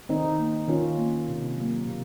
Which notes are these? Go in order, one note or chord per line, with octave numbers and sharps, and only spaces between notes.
D#3 C4 D#4
A#3
D#3 C#4 F4
A#3
C3
F#3 A#3
C3